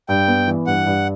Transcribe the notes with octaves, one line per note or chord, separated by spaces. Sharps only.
G2 G5
B3
E3
G2 F#5
G2